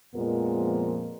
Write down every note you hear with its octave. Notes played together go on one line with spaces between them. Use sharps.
F2 A#2 F3 G#3 B3 A#4